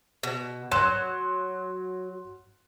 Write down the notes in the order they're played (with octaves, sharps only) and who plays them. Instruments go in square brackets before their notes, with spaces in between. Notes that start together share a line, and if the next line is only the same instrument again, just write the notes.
[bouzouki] B2
[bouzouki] F#3 [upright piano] C6 F#6 E7